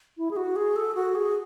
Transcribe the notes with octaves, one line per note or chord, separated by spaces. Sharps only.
E4
G#4
F#4
G#4
A4
F#4
G#4